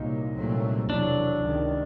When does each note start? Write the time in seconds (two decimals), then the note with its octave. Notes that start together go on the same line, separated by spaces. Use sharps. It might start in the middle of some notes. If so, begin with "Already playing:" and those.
Already playing: C2 A#2 F#3 A#3 D#4
0.34 C2 A#2 F#3 A3 C4
0.90 F1 E2 B2 F#3 D4
1.44 C#2 C3 D#3